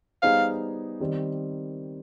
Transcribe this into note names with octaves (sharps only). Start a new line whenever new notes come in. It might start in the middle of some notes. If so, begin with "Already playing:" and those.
G3 B3 D#4 G#4 C5 F5
D#3 G3 C4